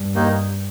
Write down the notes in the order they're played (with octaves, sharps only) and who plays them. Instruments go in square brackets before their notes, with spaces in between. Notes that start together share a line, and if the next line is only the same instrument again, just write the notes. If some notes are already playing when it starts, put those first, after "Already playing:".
Already playing: [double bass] G2
[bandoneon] D#2 D#3 A#3 D#4